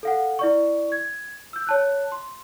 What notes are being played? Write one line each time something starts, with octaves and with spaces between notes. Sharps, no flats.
A4 F5 F#5
E4 D5 C#6
G#6
E6 G6
C#5 A5 F#6
C6